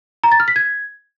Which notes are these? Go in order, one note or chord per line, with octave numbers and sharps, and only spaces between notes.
A#5
A6
F6
B6
G#6